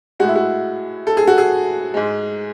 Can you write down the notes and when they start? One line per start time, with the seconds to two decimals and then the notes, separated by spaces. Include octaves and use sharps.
0.19 A2 G#3 F#4
0.28 E4
0.35 F#4
1.07 A4
1.17 G#4
1.27 F#4
1.38 G#4
1.94 G#2 G#3